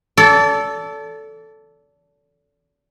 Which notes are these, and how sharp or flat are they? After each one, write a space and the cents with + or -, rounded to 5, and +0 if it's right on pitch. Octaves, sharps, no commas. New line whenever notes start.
A4 +0 D5 -35